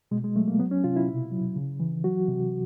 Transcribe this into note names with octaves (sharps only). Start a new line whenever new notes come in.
B2 G#3
G#3
F#3 A3
A#3
F#3 B3
C#4
C3 F4
E4
B2
F#3
C#3
E3
F#3 F#4
C3